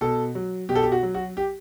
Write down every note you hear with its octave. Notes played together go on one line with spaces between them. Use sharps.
B2 A4
F#3
B2 G4
A4
G4
F#4
F#3
F#4
G4